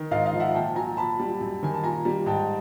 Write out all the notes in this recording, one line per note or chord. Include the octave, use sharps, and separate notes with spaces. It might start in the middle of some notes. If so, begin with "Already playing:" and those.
Already playing: D#3
G#2 D#5 F5
D#5 F5
F3
E5 F#5
A#2 G5 A5
F#3 G#5 A#5
A#2 A5 B5
G3
F#2
D#3 G#5
A5
A#2 G#5 A#5
G3
G#2 G5 A5